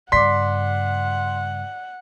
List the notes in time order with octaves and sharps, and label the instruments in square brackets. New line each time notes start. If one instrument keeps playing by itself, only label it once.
[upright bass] G2 C#3 [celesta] D5 D6 [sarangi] F#5 [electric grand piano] C6 B6